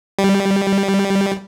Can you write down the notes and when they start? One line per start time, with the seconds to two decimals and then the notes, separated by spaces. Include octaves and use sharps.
0.18 G3